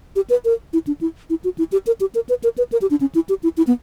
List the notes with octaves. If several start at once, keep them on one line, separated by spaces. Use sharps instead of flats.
G4
B4
A#4
E4
D4
E4
E4
F#4
E4
G4
A#4
G4
A#4
B4
A#4
B4
A#4
G4
D4
C#4
E4
G4
E4
E4
B3